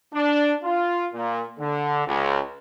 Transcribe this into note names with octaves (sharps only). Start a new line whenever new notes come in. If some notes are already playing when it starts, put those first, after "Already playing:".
D4
F4
A#2
D3
C#2